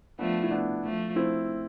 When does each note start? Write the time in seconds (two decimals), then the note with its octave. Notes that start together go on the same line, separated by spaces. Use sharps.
0.19 F3 A3 B3 D4
0.43 E4
0.51 B3 D4
0.84 F3 A3
1.16 C4 E4